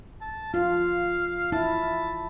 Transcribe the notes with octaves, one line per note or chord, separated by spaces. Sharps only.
A5
F4 F5
E4 A5